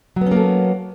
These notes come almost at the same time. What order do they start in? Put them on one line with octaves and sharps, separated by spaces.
F#3 B3 C#4 A#3 A4